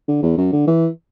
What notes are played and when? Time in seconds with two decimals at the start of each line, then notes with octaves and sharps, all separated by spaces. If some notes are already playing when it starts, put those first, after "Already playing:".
0.08 D3
0.23 E2
0.37 F#2
0.53 D3
0.67 E3